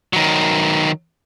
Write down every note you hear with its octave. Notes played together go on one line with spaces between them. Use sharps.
D#3 F#3